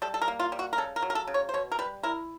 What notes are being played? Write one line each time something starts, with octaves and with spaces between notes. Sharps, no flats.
G3 A4
A4
A#4
A#3
F4
G3
F#4
A#4
C#3 A4
A#4
F#3
A#4
A4
C#3
C#5
C5
B2 C#5
A#4
G3 B4
E4 A#4